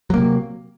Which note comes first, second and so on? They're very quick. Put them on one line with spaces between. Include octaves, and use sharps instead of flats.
F#3 A#3 C3